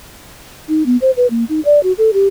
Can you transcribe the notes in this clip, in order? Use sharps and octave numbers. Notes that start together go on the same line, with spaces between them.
D#4
B3
C5
B4
A#3
D#4
D5
F#4
A4
G4